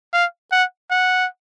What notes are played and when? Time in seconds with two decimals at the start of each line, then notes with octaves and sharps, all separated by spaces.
0.13 F5
0.52 F#5
0.91 F#5